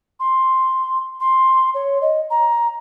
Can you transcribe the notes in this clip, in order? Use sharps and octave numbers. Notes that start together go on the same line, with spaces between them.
C6
C6
C#5
D#5
A#5